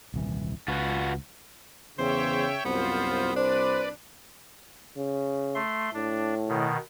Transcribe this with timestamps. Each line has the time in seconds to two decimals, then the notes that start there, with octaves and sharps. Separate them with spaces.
0.14 D#1 C2 E3
0.68 C#2 F4 F#4 B4
1.99 E2 C#3 C5 C#5 E5 G5
2.65 C2 F#2 B3 F4 C5
3.36 D4 B4 C5 D5
4.97 C#3
5.55 A3 C6
5.94 A2 D4
6.49 B2 D#3